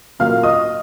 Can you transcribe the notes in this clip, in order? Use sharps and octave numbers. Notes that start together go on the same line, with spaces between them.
A#2 F#3 A#3 F5 F6
D#5 D#6